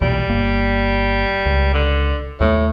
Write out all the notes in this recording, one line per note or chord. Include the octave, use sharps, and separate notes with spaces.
B1 E2 A#2 G3
G1 A#3
C#2
D3
D#2 A2 G3 A3